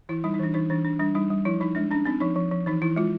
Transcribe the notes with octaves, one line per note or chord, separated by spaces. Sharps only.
E3 E4
G3 D#4
D#4
E3 D4
E3 D#4
E3 D4
D4
G3 D4
G3 D#4
G3
F3 E4
F3 D#4
G#3 D4
C#4 D4
C4 D#4
F3 D#4
F3
F3
E3 D#4
E3 E4
G#3 F4